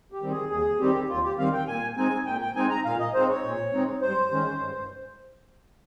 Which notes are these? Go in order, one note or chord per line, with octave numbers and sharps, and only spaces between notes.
G4
D#3 G3 C4
G#4
D#2 G#4
D#3 G3 C4 G4
D#2 F4
G4
D#3 G3 C4 F5
G5
A#2 G#5
G#3 C4 D#4 G#5
A#2 G5
G5
G#3 C4 D#4 G#5
A#5
A#2 F5
D#5
G#3 C4 D#4 C5
C#5
A#2
G#3 C4 D#4
G2 C5
D#3 G#3 C#4
G2